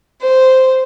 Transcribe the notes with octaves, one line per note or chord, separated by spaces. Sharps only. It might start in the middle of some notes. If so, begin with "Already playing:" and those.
C5